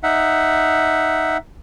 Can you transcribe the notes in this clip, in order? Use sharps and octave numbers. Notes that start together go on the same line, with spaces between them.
D#4 E5 F#5